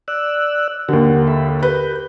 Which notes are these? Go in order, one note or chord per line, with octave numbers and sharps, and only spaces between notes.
D5 E6 F#6
D#2 D3 G4 A#4 F#5
A4 E5 B5
G4 A#4 B4 G6